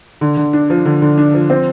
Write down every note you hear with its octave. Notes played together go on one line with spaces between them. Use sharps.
D3
D3
D4
F3
D3
D3
D4
F3
C4